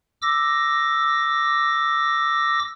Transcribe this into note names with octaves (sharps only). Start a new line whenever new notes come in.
D6 E6 A#6